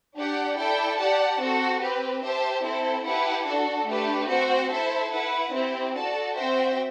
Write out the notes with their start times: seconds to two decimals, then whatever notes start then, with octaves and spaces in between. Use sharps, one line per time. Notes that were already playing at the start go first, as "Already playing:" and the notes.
0.15 D4 G4 D5 F#5
0.57 E4 A4 D5 G5
0.98 G4 D5 F#5 A5
1.39 C4 F#4 A4
1.80 C4 G4 B4
2.22 G4 C5 E5 A5
2.62 C4 E4 A4 C5
3.04 E4 G4 B4 F#5 A5
3.46 D4 F#4 A4
3.87 A3 D4 G4 B4
4.28 C4 F#4 C5 G5
4.70 E4 A4 C5 E5
5.11 E4 B4 F#5
5.52 C4 E4 G4
5.93 F#4 A4 D5 A5
6.34 C4 F#4 C5 E5 G5